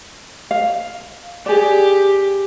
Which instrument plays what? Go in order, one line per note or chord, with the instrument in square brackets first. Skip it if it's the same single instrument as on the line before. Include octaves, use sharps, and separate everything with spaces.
[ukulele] F5
[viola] G4 [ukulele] G#4 D5